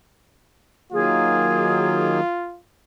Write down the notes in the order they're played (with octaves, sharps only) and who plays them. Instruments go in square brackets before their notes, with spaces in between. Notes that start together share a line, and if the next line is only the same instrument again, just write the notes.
[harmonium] D#3 F#3 A#3 [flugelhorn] F4 [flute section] G#4